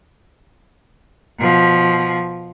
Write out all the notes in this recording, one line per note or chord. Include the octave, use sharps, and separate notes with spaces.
B2 F3